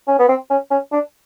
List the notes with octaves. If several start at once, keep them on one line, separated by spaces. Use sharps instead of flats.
C#4
B3
C4
C#4
C#4
D4